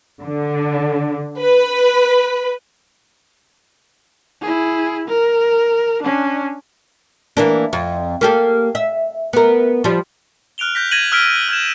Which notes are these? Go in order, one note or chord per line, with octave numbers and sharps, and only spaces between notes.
D3
B4
E4 G#4
A#4
C#4 D4
E3 A#3 D4
F2
A#3 G4 A4
E5
B3 A#4
F3 G3
F6 F#6 D7 F7 G7
F#6 G6 A#6 B6
G#6 A#6 D#7 E7 F#7
E6 F6 B6 D7 G7
F6 G6 G#6 E7